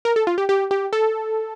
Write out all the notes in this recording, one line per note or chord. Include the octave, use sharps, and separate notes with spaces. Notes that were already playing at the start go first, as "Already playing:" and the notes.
A#4
A4
F4
G4
G4
G4
A4